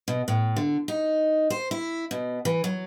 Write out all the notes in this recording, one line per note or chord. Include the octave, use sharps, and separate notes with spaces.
B2
A2
D3
D#4
C5
E4
B2
E3
F#3